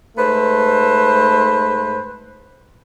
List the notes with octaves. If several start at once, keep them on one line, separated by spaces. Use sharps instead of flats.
G#2 A3 B4 C5